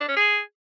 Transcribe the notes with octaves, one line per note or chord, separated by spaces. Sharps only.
D4
C#4
G#4